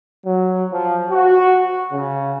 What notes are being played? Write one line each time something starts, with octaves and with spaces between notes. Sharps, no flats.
F#3
F3
F#4
C#3